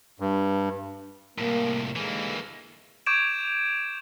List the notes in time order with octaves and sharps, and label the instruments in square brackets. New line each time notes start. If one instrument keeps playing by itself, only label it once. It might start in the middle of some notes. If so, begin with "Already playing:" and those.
[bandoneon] G2
[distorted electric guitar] C2 A2 [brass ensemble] A#3
[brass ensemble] D#2 D3 G#3 [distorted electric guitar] E3 A#3
[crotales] C#6 D6 G6 G#6 D7 E7